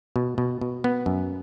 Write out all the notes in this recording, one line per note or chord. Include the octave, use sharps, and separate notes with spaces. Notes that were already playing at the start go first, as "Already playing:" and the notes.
B2
B2
B2
B3
F#2